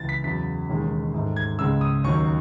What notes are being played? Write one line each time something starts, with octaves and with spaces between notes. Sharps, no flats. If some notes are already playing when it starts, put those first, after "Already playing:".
Already playing: C#2 C#3 E3 A6
B6
E2 C#3 F#3 B6
E1 D#2 D#3 G#3 C#4
G#2 D#3 A3
G#6
C#2 C#3 G#3 E6
D#6
D#2 D#3 F#3 C#4 C#6